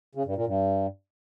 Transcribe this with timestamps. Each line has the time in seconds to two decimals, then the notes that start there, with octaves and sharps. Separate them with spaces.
0.15 C#3
0.26 G2
0.36 A#2
0.46 G2